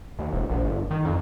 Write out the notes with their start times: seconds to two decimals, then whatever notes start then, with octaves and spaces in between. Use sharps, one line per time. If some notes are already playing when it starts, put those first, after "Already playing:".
0.19 D#2
0.33 E1
0.50 A#1
0.65 G1
0.91 D#3
1.05 F2